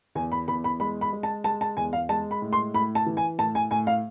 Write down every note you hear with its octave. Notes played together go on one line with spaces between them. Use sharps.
E2 G#5
B5
E2 B5
B5
G#3 B5
B5
G#3
A5
G#3 A5
A5
E2 G#5
F5
G#3 A5
B5
A2
C6
A2 B5
A5
E3
G#5
A2 A5
G#5
A2 G#5
F5